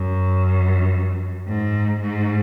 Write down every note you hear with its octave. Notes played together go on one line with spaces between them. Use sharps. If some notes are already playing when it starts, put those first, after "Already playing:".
Already playing: F#2
G#2
G#2